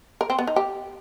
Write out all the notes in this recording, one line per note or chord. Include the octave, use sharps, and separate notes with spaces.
A#4
C4
B3
D#4
G4